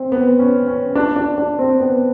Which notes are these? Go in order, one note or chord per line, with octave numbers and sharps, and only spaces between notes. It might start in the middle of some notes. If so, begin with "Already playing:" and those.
Already playing: C4
B3
C#4
C#4
D4
D4
D4
C4
B3